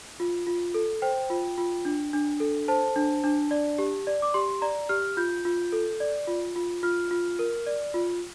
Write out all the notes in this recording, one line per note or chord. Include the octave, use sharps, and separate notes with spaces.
F4
F4
A4
C5 G5
F4
F4
D4
D4
A4
C5 A5
D4
D4
D5
G4
D5
D6
G4 C6
D5 A#5
G4 F6
F4 G6
F4
A4
D5
F4
F4
F4 F6
F4
A#4
D5
F4